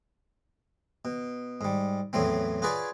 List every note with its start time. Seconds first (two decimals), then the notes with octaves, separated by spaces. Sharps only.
1.05 B2
1.61 G#2 G3
2.13 E2 A2 F#3 A3 C4
2.62 F4 F#4 G#4 B4 C#5 D5